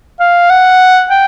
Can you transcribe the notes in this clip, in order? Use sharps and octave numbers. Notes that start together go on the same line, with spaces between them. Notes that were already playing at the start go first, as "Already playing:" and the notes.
F5
F#5
G5